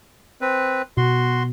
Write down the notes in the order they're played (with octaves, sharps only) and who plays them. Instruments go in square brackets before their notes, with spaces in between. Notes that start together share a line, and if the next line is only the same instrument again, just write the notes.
[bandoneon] C4 B4
[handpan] B2 [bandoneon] F#4 C6